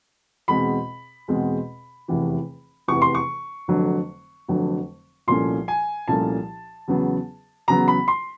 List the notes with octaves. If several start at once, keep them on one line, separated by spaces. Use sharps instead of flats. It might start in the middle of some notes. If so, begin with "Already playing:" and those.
E2 B2 G#3 C4 B5
E2 B2 G#3 C4
F1 E2 C3 E3
F1 E2 C3 E3 C#6
C6
C#6
F1 F2 D3 F#3
F1 F2 D3 F#3
C2 A#2 F3 A3 C#4 C6
G#5
C2 A#2 F3 A3 C#4 A5
E2 C#3 F#3 B3
E2 C#3 F#3 B3 A#5
B5
C6